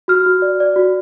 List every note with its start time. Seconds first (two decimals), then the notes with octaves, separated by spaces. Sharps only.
0.08 F#4 F6
0.26 F#4
0.42 D5
0.60 D5
0.76 F#4